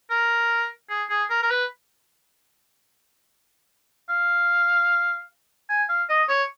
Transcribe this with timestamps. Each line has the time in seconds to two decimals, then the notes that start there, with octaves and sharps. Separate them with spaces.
0.10 A#4
0.89 G#4
1.09 G#4
1.30 A#4
1.43 A#4
1.50 B4
4.09 F5
5.69 G#5
5.89 F5
6.09 D#5
6.29 C#5